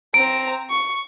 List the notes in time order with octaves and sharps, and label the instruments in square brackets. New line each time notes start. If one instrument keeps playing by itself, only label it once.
[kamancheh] C4 A#5 [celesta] D7
[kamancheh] C#6